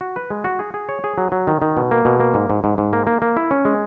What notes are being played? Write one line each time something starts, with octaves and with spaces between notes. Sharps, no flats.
F#4
B4
G#3
F#4
G#4
G#4
C#5
G#4
F#3
F#3
D#3
D#3
B2
A#3
B2
A#3
G#2
G#2
G#2
G#2
A#3
A#3
A#3
E4
C#4
G#3